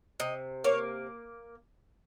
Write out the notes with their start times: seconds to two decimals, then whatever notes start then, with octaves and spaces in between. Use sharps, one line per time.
0.20 C3 D#5
0.64 A#3 C#5